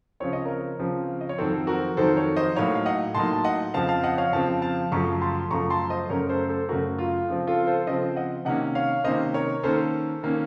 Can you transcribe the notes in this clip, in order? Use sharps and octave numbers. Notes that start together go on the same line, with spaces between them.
C#3 F3 C4 C#5
D#5
A#4 C#5
C#3 F3 C4
D#5
C#5
F2 D#3 F#3 C4 A4 C5
F#4 A#4
F2 D#3 F#3 C4 A4 C5
A#4 C#5
C5 D#5
A2 F#3 A#3 D#4 C#5 F5
F5
D#5 F#5
A2 F#3 A#3 D#4 A5 C6
A5
D#5 F#5
F2 C#3 F3 C4 F5 A5
F5 A5
D#5 F#5
C#5 F5
F2 C#3 F3 C4 F5 A5
F5 A5
F#2 C#3 F3 A3 A#5 C#6
A5 C6
F#2 C#3 F3 A3 A#5 C#6
A5 C6
C5 D#5
F#2 C#3 A3 C#4 A#4 C#5
A4 C5
A4 C5
F#2 C#3 A3 C#4 F#4 A#4
F4
C#3 F3 C4
F4 A4
A4 C5
C#3 F3 C4 C5 D#5
D#5 F#5
C3 D#3 A#3 C#4 D#5 F#5
C#5 F5
C3 D#3 A#3 C#4 C5 D#5
A#4 C#5
D#3 A#3 C#4 A4 C5
D#3 A#3 C#4